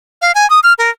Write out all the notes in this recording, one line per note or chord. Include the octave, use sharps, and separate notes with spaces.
F5
G#5
D#6
F6
A#4